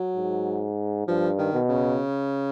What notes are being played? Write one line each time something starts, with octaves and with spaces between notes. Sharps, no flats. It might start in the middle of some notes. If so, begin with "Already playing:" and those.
Already playing: F#3
G#2
G2 F3
D#3
B2
C#3